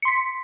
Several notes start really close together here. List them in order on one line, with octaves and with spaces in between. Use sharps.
C#7 C6 B6